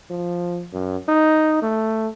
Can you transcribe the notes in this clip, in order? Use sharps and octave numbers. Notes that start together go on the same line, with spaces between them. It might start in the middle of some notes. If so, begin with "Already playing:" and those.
F3
F#2
D#4
A3